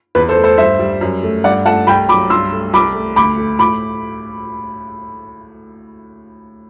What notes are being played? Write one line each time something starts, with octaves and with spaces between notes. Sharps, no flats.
E2 B4
A4 C5
A3
A4 C5
G2 C5 E5
G3
F#2
A3
G2 D5 F#5
A3 F#5 A5
C2 G5 B5
F#3 B5 D6
G2 C6 E6
A3
C2 B5 D6
A3
D2 B5 D6
A3
A2 B5 D6